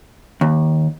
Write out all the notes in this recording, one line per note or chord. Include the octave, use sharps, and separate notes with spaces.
D#2